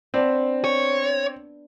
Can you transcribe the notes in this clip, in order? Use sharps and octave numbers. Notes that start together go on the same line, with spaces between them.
B3 C4 D4
C#5